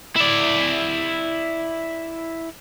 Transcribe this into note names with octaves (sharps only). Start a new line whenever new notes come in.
E4 D5